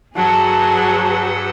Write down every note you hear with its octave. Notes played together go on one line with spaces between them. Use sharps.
G2 F#3 G#4 A4 B4 F#5 A5